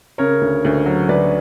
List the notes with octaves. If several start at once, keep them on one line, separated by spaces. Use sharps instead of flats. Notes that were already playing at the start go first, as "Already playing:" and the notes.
C#3 A#4 C#5
D2
D2
F#3
D2 B4 D5